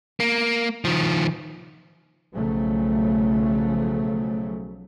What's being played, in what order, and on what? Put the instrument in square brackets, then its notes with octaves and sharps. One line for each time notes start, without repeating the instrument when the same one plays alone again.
[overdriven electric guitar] A#3
D#3 F3
[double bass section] B1 C#3 F3 F#3 A3